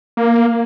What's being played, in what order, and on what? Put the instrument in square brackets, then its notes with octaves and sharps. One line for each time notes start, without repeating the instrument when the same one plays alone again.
[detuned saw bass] A#3